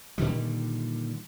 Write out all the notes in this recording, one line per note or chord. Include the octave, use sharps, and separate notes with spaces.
A#2 D3 D#3 G3